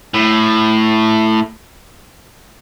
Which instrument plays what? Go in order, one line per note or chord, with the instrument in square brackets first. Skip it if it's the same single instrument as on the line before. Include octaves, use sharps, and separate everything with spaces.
[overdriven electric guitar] A2